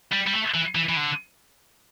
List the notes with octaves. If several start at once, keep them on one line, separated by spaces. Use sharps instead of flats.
G3
G3
A3
E3
E3
E3
D3